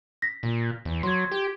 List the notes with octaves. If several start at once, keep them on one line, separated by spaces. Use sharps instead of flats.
A#6 B6
A#2
E2
F#3 C6 G#6
G4